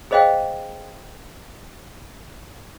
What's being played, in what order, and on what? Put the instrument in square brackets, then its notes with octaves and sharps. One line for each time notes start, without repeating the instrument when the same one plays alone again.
[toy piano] G#4 C5 D#5 F5 G5